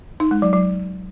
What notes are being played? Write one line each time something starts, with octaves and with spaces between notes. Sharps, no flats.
D#4
G#3
F#3
F#3